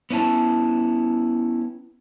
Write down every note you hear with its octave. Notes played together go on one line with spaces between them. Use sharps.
B3 C#4 E4 A5